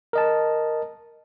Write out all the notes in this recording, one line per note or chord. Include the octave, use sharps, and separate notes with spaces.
A#4 D#5 A5